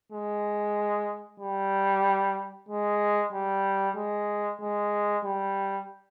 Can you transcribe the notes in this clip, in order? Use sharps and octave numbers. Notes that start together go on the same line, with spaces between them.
G#3
G3
G#3
G3
G#3
G#3
G3